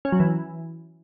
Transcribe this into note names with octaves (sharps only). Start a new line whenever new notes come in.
C#4
F#3
E3